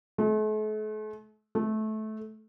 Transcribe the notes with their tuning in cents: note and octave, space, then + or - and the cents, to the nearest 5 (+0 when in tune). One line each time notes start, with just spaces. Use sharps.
A3 -45
A3 -20